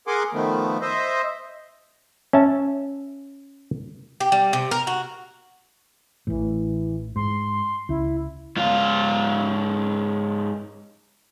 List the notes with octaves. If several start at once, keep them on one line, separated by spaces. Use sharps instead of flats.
G#4 A#4 F#5 G#5 C6 D6
D#3 F3 A3 B3
C5 D#5 E5
C#4 E5 A5
G4
G3
C3
A#4
F#4
A1 A2 E3
G#2 C6
C#2 E4
G#2 F4